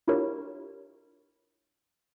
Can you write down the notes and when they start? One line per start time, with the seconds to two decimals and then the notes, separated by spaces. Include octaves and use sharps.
0.08 D4 E4 F4 G4 A#4 C#5